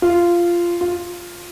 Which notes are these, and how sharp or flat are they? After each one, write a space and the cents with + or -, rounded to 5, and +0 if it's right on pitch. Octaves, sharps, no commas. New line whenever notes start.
F4 -10
F4 +5